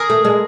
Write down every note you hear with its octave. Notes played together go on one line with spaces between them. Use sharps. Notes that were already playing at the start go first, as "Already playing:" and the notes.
Already playing: G#4 A#4
A3
G#3